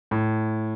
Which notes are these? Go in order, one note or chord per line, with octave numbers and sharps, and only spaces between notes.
A2